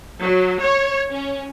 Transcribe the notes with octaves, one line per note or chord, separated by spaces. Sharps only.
F#3
C#5
C#4